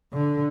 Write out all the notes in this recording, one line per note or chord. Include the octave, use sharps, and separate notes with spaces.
D3